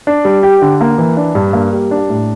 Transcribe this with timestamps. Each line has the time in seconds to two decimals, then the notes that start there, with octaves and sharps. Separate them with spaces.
0.07 D4
0.25 G3
0.43 G4
0.62 D3
0.81 A#3
0.98 E3
1.17 D4
1.35 G2
1.53 A#3
1.73 G3
1.91 D4
2.09 A2